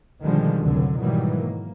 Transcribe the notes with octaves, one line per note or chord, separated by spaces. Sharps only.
B2 D3 D#3 F3 G3 G#3
F1 C#2 D3 F#3
G#2 B2 D#3 E3 F#3 G3
A#3